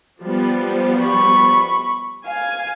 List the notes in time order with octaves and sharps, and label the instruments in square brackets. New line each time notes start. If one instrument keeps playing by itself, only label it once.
[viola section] F3 G3 B3
[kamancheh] C5
B5 C#6
[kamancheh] F5 [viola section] G#5